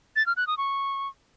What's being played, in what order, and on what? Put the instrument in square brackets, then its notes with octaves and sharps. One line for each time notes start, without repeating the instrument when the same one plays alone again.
[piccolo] A6
F6
F#6
D#6
C#6